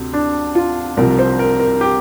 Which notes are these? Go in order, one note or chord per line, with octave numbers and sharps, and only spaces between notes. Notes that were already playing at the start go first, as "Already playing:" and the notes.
Already playing: D2 C3
D4
F4
C2 C3 F3 A#4
C5
A#4
A#4
G4